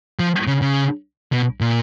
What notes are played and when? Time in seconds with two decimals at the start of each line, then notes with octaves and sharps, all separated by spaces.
0.19 F3
0.47 C#3
0.62 C#3
1.33 B2
1.61 A#2